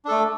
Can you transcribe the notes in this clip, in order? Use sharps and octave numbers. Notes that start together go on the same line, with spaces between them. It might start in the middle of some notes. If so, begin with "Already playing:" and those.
A3 D4 A4